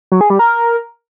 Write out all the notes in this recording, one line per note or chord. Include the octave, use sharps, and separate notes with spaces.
F#3
G#4
G3
A#4